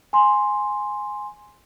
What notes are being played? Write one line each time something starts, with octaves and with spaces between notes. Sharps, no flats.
G#5 C6